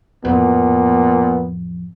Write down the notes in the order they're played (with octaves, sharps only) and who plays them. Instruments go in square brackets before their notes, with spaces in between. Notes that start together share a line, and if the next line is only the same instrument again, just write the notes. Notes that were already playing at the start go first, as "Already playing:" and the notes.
[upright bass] A1 F2 [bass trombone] A#2 [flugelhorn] B3